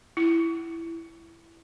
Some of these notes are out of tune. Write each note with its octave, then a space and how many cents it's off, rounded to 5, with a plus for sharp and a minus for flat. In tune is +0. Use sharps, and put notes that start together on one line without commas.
E4 +10